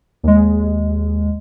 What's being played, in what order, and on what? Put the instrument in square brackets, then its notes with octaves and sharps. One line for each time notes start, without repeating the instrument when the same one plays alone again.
[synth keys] D#2 G#3